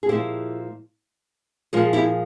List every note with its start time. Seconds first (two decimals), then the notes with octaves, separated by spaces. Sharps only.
0.03 G#4
0.09 A#2 F3 G#3 E4 G4
1.73 A#2 F3 G#3 F4 G#4
1.93 E4 G4